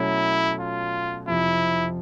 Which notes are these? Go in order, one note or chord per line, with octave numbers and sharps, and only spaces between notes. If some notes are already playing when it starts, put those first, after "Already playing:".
Already playing: B2 F#3 A3 C#4 E4
F4
F2 C3 F3 E4